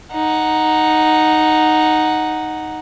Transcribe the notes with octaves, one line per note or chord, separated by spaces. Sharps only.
D#4 F#5